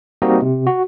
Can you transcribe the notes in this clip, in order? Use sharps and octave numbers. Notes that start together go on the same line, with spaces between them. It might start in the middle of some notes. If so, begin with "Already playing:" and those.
G3 A#3 C4 D#4 F#4 D#5
C3
F#4